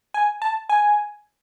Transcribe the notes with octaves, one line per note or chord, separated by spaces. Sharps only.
G#5
A5
G#5